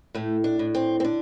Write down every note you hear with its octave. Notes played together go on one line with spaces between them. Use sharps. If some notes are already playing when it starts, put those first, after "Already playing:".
A2 A3
D4
A2
C4
C4
D3 D4